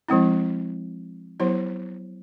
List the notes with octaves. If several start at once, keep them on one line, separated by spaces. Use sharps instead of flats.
F3 G#3 C4 E4
F#3 B3 E4 G4 C5